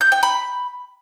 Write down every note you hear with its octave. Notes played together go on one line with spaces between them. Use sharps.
G6
G5
B5